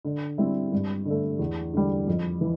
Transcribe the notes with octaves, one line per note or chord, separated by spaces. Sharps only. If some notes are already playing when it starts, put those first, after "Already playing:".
D3
G3 C4 E4
G2
D3 A3
E2
D3 G3
F2
E3